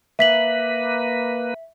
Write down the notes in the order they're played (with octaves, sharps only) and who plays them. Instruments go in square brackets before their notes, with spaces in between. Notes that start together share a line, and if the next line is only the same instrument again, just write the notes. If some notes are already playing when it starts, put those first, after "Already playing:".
[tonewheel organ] A#3 B4 [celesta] E5 B6 F#7